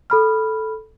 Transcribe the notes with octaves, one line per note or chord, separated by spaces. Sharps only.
A4 B5 F6